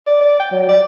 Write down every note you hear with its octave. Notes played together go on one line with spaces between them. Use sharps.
D5
D5
G5
F#3
D5